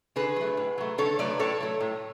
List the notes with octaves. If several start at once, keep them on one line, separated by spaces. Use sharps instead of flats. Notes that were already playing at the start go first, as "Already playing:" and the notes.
D3 G#4 B4
F#3 A3
A2
F#3 A3
D3 A4 C#5
F#3 A3 B4 D5
A2 A4 C#5
F#3 A3
A2